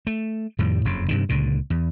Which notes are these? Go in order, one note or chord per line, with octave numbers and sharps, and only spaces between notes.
A3
F2 A2 D#3 G3
F#1 F2 C#3
G2 C3 D#3
C#2 A#2 D3
E2